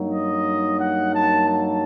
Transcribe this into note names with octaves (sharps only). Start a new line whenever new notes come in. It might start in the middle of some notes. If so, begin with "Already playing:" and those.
Already playing: G2 F#3 A#3 D#4
D#5
F#5
A5
A5